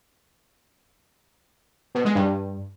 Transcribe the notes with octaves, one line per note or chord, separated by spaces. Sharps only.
B2
G#3
G2